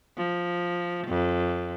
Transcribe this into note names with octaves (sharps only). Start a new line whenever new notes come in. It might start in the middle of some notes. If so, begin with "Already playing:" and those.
F3
F2